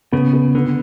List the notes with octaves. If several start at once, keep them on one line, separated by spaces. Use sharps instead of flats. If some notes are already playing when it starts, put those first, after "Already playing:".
C#3 B3
B3
D3 B3